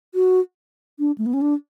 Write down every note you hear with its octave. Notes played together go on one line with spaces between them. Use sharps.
F#4
D4
A3
B3
C#4
D4